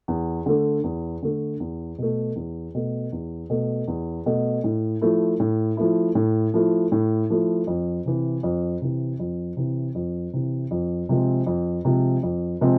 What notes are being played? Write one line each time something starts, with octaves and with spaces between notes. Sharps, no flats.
E2
D3 A3
E2
D3 A3
E2
B2 A3
E2
B2 A3
E2
B2 A3
E2
B2 A3
A2
F3 A3 E4
A2
F3 A3 E4
A2
F3 A3 E4
A2
F3 A3 E4
F2
C3 E3
F2
C3 E3
F2
C3 E3
F2
C3 E3
F2
C3 F3 G#3 C4
F2
C3 F3 G#3 C4
F2
C3 F3 G#3 C4